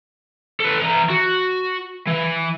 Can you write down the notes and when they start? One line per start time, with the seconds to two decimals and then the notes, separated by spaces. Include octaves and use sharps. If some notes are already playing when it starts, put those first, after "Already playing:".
0.60 A4 B4
0.81 E3 A#5
1.10 F#4
2.07 E3